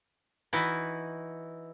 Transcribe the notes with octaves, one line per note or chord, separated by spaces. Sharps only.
E3 D#4 E4 F#4